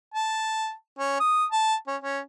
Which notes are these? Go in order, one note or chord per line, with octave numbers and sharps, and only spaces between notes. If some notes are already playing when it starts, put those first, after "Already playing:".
A5
C#4
D#6
A5
C#4
C#4